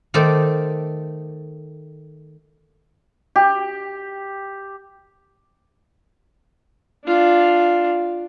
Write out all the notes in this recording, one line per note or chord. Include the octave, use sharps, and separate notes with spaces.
D#3 A3 A4 C5 D5
G4
D4 F4